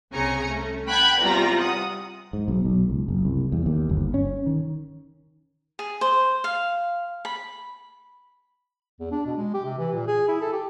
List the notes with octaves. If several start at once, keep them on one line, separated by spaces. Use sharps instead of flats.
C2 C#3 C4 G#5 A#5 C#7
A3 C#4
F#5 G5 A5 B5 F#6 G#6
E2 C3 G3 F4 A#5 A#6
F#5 D#6
G#2
B1
B1
C#2
F#1
C2
E2
D#2
G1
C#4
D#3
G#4
C5
F5
B5
E2
D4
B2
G#3
G4
C3
E3
A#2
G#4
E4
A4
G4